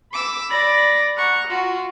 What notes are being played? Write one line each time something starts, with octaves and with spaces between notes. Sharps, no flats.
B5 D6 E6
D5 B5 A#6
F#5 A#5 C#6
F4 F#4